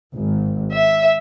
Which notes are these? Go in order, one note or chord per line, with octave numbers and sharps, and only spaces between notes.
G#1
E5